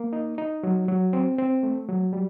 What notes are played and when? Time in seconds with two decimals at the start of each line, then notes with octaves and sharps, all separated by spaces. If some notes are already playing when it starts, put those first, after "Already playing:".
Already playing: A#3
0.13 D#4
0.38 D#4
0.63 F#3
0.88 F#3
1.13 C4
1.38 C4
1.63 A3
1.88 F#3
2.13 G3